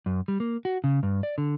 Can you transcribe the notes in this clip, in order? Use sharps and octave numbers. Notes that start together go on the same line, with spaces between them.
F#2
G3
A#3
F#4
C#3
G2
D5
D3